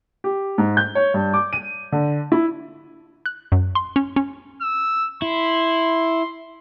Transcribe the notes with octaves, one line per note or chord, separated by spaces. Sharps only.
G4
G#2
G6
C#5
G2
D6
D#7
D3
E4
F#6
F#2
C6
C#4
C#4
E6
E4 C6